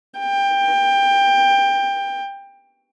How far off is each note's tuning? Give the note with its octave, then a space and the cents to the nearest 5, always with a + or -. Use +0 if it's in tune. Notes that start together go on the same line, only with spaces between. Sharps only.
G5 +20